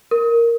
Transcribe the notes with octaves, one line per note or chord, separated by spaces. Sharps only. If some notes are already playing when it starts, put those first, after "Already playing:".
A#4